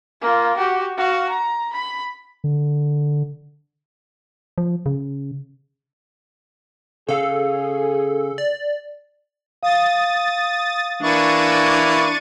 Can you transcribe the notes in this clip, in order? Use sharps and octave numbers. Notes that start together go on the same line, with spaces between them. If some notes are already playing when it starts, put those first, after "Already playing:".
A#3 F4
F#4 G4
F#4 F5
A#5
B5
D3
F3
C#3
C#3 G#4 A4 F5
D5
F5 D#6 A6
E3 A#3 D4 E4 C#6 A6 D#7